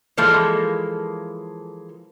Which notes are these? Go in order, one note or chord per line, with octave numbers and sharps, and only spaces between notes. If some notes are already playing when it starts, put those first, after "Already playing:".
E3 F3 G#3 A#3 E4 A4